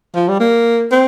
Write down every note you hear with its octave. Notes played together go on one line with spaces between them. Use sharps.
F3
G3
A#3
C4